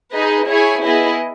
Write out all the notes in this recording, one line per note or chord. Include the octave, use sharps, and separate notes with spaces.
D#4 G#4 B4 D#5
E4 G#4 C#5 G#5
B3 E4 G#4 D#5